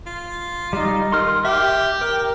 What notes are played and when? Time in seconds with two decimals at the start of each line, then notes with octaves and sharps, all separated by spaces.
0.07 F4
0.73 G3 D#4
1.12 D#3 C6 F6
1.45 G4 E5 D6
2.01 A#4